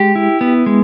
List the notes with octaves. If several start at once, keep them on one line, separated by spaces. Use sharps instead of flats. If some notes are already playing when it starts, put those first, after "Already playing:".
Already playing: G#3 G4
E4
B3
G#3